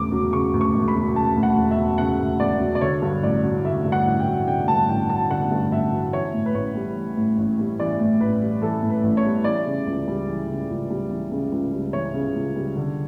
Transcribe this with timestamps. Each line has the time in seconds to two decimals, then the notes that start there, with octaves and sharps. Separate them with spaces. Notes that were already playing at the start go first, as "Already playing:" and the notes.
Already playing: E1 D2 C#3 D6
0.12 F#3
0.33 C#3 C#6
0.54 D2
0.61 C#6
0.74 E1
0.88 B5
0.95 F#3
1.16 C#3 A5
1.36 D2
1.43 F#5
1.58 E1
1.71 E5
1.78 F#3
1.98 C#3 F#5
2.20 D2
2.40 E1 D5
2.60 F#3
2.75 D5
2.81 D3 C#5
3.02 G2
3.23 A1 D5
3.44 F#3
3.64 D3 E5
3.85 G2
3.92 F#5
4.06 A1
4.20 G5
4.27 F#3
4.47 D3 G5
4.68 G2 A5
4.88 A1 G5
5.10 F#3 A5
5.30 D3 F#5
5.51 G2
5.71 A1 E5
5.92 F#3
6.13 E3 C#5
6.33 A2
6.46 B4
6.54 A1 C#5
6.75 G3
6.96 E3
7.17 A2
7.38 A1
7.59 G3
7.79 E3 D5
8.00 A2
8.20 A1 B4
8.41 G3
8.61 E3 A4
8.82 A2
8.90 B4
9.03 A1
9.17 C#5
9.24 G3
9.44 E3 D5
9.65 C#3
9.86 C#2
10.08 G3
10.28 E3
10.49 C#3
10.70 C#2
10.90 G3
11.11 E3
11.31 C#3
11.52 C#2
11.73 G3
11.93 E3 C#5
12.14 C#3
12.35 C#2
12.56 G3
12.76 D3